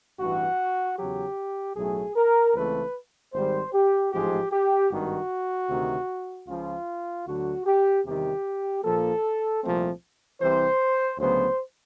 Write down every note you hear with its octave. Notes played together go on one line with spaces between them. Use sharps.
A1 G2 E3 F#4
E2 C#3 F#3 G4
B1 A2 F#3 A3 G#4
A#4
C#2 C#3 E3 A3 C4 B4
G#1 G#2 D#3 G3 C5
G4
A1 G#2 F3 G#3 G4
G4
G#1 G2 D#3 F#4
D2 C3 D#3
C#2 C#3 F3 F4
D2 D3 F#3 F#4
G4
E2 C3 D#3 G3 G4
A#1 A#2 F3 A#3 A4
C2 A#2 F3 A3 C4
C2 C3 E3 C5
D2 C#3 F#3 B3 C5